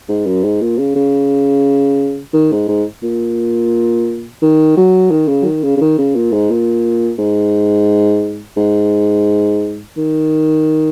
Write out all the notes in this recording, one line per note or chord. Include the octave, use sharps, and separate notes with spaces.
G#2
F#2
G#2
A#2
C#3
C#3
D#3
G#2
G#2
A#2
D#3
F#3
D#3
C#3
F#3
D#3
C#3
C#3
D#3
C#3
A#2
G#2
A#2
G#2
G#2
D#3